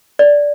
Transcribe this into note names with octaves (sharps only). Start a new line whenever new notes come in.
D5